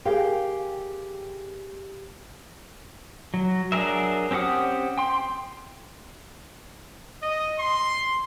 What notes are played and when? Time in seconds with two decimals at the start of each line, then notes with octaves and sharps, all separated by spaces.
0.05 G4 G#4 A#4 F5 G5
3.34 F#3
3.72 F#3 D4 G#4 A#4 E5
4.31 C4 C#4 G4 F#5 D#6
4.98 G5 C6
7.23 D#5
7.59 C6